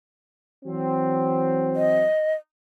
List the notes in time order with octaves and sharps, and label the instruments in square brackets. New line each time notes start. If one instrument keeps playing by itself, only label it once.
[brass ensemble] E3 F#3 C4
[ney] D#5